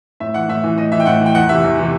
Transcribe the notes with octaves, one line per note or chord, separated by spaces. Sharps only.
A2 E5
E3 F#5
A2 E5
E3
A2 D#5
E3 E5
G5
A2 F#5
E3
G5
E2 F#5
C3 E3 E5
E2
C3 E3